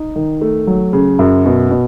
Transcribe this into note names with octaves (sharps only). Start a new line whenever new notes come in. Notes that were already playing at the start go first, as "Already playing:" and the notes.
Already playing: D#4
D#3
A3
F#3
C#3
F#2
B2
B2